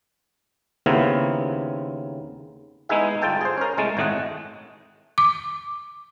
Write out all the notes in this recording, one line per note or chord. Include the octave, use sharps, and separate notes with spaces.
D#2 C#3 B3 C4 E4 A#4
G#3 B3 D#4 E4 G#4 E5
G1 F4 A4 G5 A5
G#4 C5
C#4 A#4
C2 G#3 A3 A5
G#1 A2 A3 D#5 F#5
D6